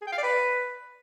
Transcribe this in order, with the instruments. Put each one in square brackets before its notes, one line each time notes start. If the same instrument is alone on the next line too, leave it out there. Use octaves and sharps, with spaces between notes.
[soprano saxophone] G#4
G5
F5
D5
B4